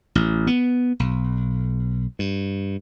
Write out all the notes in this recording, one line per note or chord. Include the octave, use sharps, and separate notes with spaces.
A1
B3
B1
G2